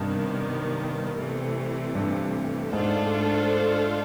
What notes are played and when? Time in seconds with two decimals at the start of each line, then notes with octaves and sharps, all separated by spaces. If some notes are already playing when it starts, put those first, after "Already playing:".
Already playing: G2 C3 D#3 G3 B3
1.17 C3 E3 A3
1.95 G2
2.73 G#2 A3 D4 F4 A4 C5